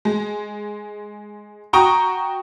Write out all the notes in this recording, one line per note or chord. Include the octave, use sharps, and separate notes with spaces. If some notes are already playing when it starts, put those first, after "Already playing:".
G#3
F#4 G5 A#5 C#6 D#6